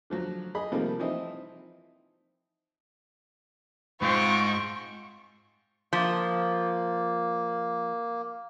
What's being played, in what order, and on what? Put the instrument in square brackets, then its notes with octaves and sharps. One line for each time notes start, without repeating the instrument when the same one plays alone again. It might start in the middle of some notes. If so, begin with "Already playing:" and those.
[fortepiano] D3 F3 F#3
G#4 D#5 B5
C3 D#3 F3 G3 A3 A#3
E3 F3 C4 D#4 E4 D#5
[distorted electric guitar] G#2 [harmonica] C4 C5 [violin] F4 D7 [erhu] C#6
[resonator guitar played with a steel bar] F3 [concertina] A#3